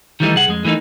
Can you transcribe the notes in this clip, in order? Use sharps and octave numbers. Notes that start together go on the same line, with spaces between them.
D#3 E3 G3 A3 B3 D#4
C2 G#4 F#5
F2 G#3
E3 A3 A#3 D4 D#4